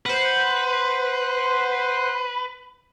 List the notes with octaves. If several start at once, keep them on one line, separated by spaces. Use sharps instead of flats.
B4 C5 F#5